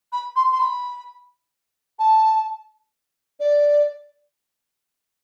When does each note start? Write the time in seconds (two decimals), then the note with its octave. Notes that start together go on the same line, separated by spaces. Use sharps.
0.13 B5
0.36 C6
0.52 C6
0.60 B5
1.99 A5
3.40 D5